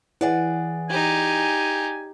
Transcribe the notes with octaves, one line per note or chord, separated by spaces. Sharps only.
E3 G#4 D5 F#5
D#4 G4 G#5